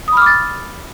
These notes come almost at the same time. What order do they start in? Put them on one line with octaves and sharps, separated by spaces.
D#6 B5 F6 D6 A6